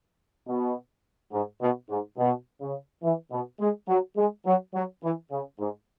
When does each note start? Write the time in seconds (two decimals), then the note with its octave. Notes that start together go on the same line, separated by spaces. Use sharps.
0.47 B2
1.32 G#2
1.61 B2
1.90 G#2
2.18 B2
2.61 C#3
3.03 E3
3.31 B2
3.60 G#3
3.88 F#3
4.17 G#3
4.46 F#3
4.73 F#3
5.03 E3
5.31 C#3
5.59 G#2